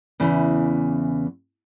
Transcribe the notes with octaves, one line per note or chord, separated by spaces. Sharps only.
E2 C#3 E3